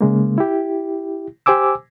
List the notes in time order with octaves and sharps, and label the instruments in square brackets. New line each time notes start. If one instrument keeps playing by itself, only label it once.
[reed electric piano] C#3 G#3 A#3
E4 G4
G4 C5 G#5 D6 E6